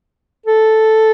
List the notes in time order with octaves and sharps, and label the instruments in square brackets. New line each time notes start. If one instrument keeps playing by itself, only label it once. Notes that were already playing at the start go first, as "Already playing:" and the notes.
[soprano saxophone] A4